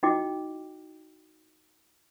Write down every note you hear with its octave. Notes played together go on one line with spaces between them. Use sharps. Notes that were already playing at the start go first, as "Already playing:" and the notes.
D#4 E4 F#4 D#5 G5 D6